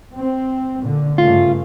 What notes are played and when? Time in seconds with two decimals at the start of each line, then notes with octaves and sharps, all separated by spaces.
0.15 C4
0.82 A#2 D3
1.18 G2 C#3 A3 F4